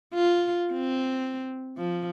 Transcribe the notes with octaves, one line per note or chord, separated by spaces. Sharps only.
F4
C4
F3